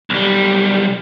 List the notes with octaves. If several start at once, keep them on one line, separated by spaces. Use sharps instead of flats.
B1 G3